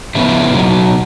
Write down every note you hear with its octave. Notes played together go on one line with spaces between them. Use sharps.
F2 C#3 B3 E4
B2 F#3 A#3 D#4